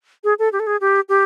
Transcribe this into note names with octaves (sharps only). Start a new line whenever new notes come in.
G#4
A4
G4
A4
G#4
G4
G4